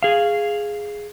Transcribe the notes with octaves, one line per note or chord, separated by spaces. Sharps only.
G#4 F5